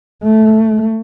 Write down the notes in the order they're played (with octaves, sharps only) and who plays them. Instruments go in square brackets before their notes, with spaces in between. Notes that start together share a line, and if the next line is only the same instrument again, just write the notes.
[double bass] A3